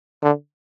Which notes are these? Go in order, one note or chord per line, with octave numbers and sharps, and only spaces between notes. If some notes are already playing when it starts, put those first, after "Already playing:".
D3